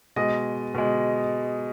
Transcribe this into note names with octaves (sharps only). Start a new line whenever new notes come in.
B2 G#3 D#5
B2 G#3